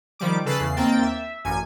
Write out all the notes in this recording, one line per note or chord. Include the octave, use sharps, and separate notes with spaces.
D#3 F3 G3 D6
C#3 A4 B4 F#6 A6 C7
E2 C#3 C7
D#2 A#3 C4 G5 A6
E5
A1 F#2 G#5